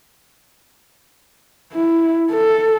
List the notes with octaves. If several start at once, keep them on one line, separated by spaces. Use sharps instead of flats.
E4
A4